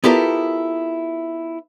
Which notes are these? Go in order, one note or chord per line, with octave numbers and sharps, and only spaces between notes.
B3 E4 F4 G4 A4 A#4